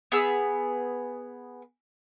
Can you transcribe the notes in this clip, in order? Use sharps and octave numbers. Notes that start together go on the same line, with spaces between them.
B3 G#4 E6